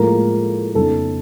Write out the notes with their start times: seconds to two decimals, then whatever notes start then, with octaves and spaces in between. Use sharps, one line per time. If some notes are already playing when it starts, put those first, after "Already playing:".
Already playing: A2 F3 G#3 A#3 A#4
0.74 F2 C#3 F#3 B3 D#4 A4